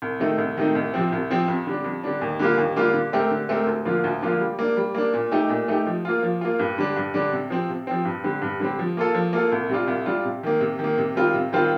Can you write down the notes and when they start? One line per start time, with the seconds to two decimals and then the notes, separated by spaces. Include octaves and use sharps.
0.02 C2
0.20 C3 D#3 A3 D#4
0.38 C2
0.57 C3 D#3 A3 D#4
0.75 C2
0.94 C3 F3 C4
1.12 C2
1.30 C3 F3 C4
1.48 F2
1.67 D3 G3 D4
1.84 F2
2.04 D3 G3 D4
2.22 D#2
2.39 D3 G3 A#3 F4
2.58 D#2
2.76 D3 G3 A#3 F4
2.94 D3
3.13 A3 C4 G4 A#4
3.31 D3
3.49 A3 C4 G4 A#4
3.67 D2
3.85 D3 F3 A#3 F4
4.04 D2
4.22 D3 F3 A#3 F4
4.40 G3
4.59 A#3 D4
4.77 G3
4.95 A#3 D4
5.13 A#2
5.32 A3 D#4 G4
5.49 A#2
5.68 A3 D#4 G4
5.87 F3
6.05 A#3 F4
6.23 F3
6.41 A#3 F4
6.59 G2
6.78 D3 G3 D4
6.96 G2
7.14 D3 G3 D4
7.32 C3
7.50 F3 C4
7.69 C3
7.87 F3 C4
8.05 G2
8.24 D3 G3 C4
8.42 G2
8.60 D3 G3 C4
8.79 F3
8.97 A#3 F4 A4
9.14 F3
9.33 A#3 F4 A4
9.52 C2
9.69 C3 G3 D4 F4
9.88 C2
10.06 C3 G3 D4 F4
10.25 C3
10.43 D#3 A#3
10.61 C3
10.79 D#3
10.84 A#3
10.98 C3
11.16 D#3 G3 C4 F4
11.34 C3
11.52 D#3 G3 C4 F4